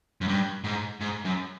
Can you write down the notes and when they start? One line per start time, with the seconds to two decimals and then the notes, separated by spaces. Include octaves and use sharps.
0.21 F#2
0.28 G2
0.64 G#2
1.01 G#2
1.25 F#2